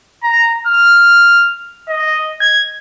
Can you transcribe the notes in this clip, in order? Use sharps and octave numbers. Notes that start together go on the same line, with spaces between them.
A#5
F6
D#5
G#6